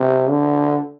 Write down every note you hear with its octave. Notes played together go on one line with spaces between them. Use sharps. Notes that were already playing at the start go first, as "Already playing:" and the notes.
Already playing: C3
D3